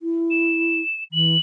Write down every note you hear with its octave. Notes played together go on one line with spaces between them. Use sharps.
E4
E7
E3 F#7